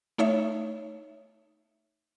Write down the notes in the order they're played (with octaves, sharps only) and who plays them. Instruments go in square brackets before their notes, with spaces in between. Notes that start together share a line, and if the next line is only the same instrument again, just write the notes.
[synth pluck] A3 D#4 C#5 E5